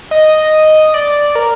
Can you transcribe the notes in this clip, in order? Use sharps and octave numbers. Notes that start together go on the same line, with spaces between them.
D#5
D5
A#4